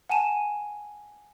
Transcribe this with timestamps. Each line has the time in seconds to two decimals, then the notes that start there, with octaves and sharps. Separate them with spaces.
0.09 F#5 G#5 A5 D#7 E7